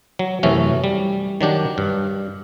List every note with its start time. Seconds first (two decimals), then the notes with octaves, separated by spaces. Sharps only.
0.19 F#3
0.43 F#2 C3 E3 A3 C#4
0.84 G3
1.41 D#3 F#3 D4 G4
1.78 G2